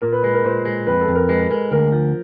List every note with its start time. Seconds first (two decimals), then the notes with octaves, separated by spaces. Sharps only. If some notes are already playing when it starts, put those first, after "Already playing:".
0.02 A#2 A#4
0.13 B4
0.23 G#3 B4
0.34 A#4
0.44 A#2 C5
0.65 G#3
0.87 F2 B4
1.01 A4
1.08 F2
1.15 A#4
1.29 G#3 B4
1.41 B4
1.50 G#3 A#4
1.71 D2 A#4
1.92 F3